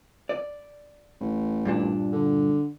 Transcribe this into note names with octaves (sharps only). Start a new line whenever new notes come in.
D5
A1
G2 A#2 D4
D3